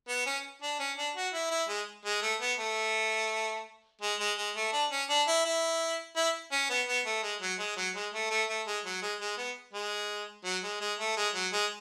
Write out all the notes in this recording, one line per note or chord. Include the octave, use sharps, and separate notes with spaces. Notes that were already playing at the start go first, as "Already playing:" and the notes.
B3
C#4
D4
C#4
D4
F#4
E4
E4
G#3
G#3
A3
B3
A3
G#3
G#3
G#3
A3
D4
C#4
D4
E4
E4
E4
C#4
B3
B3
A3
G#3
F#3
G#3
F#3
G#3
A3
A3
A3
G#3
F#3
G#3
G#3
B3
G#3
F#3
G#3
G#3
A3
G#3
F#3
G#3